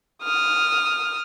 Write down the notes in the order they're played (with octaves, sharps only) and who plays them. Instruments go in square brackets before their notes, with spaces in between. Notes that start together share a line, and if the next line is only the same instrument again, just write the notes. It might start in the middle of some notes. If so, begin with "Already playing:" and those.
[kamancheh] D#6 F6